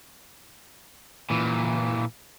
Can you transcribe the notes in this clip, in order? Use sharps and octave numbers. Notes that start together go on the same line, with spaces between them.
A#2 E3